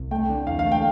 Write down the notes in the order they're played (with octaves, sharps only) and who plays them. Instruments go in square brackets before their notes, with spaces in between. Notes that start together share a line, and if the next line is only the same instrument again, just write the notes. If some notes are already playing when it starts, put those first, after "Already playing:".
Already playing: [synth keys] C2
[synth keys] A3 [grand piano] G5
[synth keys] D3
[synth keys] E2 [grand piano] F5
[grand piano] F5
[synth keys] A3
[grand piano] G5